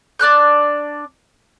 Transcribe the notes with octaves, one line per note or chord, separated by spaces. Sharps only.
D4 D5 F#6 G6